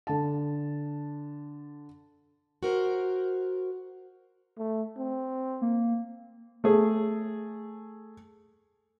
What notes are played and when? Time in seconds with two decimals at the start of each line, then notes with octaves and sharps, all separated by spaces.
0.07 D3 A5
2.63 F#4 A#4 C5
4.58 A3
4.98 C4
5.61 A#3
6.64 A3 G#4